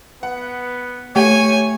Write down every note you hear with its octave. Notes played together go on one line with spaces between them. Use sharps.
B3 F#5
A3 G4 C#5 G#5